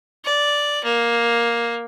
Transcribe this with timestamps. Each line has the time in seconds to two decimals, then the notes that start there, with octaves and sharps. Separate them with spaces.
0.25 D5
0.84 A#3